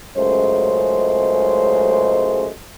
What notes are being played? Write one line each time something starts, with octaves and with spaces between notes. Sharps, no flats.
C#2 F#2 G#3 A3 C5